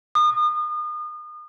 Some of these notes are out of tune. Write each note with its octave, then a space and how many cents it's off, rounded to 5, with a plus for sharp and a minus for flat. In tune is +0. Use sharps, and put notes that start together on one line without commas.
D#6 -35